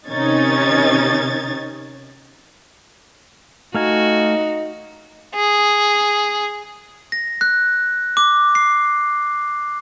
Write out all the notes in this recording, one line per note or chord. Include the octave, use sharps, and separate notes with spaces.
C3 D#3 C#4 D#4 G#6 A6
A3 D#4 F#4 F5 G#5
G#4
A#6
F#6
D6
C7